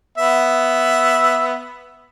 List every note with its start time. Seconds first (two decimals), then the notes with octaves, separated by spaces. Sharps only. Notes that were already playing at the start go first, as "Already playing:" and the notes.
0.18 B3 E5